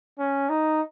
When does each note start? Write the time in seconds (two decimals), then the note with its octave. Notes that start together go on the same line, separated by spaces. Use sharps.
0.19 C#4
0.50 D#4